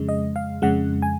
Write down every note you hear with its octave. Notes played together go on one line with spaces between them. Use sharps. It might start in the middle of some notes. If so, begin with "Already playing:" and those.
Already playing: F2 C#3 G#3
D#5
F5
F2 C#3 G#3 F#5
G#5